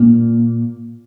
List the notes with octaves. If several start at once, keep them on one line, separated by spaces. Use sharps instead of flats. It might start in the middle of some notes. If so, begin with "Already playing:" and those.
Already playing: A#2